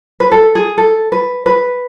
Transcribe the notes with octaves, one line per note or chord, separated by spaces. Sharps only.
B4
A4
G#4
A4
B4
B4